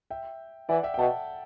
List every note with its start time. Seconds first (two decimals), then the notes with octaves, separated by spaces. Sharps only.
0.10 E5 G5
0.69 E3 D5 F#5
0.83 E5 G5
0.94 G5
0.98 B2 F#5 A5